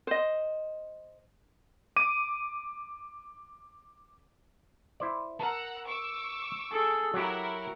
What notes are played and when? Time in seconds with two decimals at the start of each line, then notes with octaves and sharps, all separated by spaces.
0.07 C5 D#5
1.96 D6 D#7
5.00 E4 C5 D5
5.40 A#4 F#5 A5 A#5 E6
5.86 C#6 D6 E6
6.72 G#4 A4
7.14 F#3 E4 F#4 G4 A#4